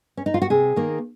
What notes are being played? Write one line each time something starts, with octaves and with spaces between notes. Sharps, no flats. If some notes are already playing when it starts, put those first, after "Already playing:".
C#4
D#4
F4
F#4
C3 G#4
D#3 A#3